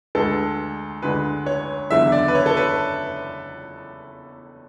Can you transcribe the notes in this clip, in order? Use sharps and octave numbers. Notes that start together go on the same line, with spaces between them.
D2 D3 G#3 A4
D2 D3 G#3 B4
C#5
F#1 E2 D3 E5
D5
B4
C#5
A4
B4